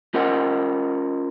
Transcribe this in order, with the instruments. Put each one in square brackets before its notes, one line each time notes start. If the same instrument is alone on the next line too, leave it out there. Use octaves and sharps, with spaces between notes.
[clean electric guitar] C#4 F4 A#4 C5 D#5 F#5